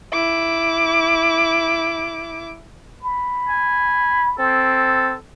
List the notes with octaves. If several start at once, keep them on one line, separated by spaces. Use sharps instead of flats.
E4 D6
B5
G#5
C4 A4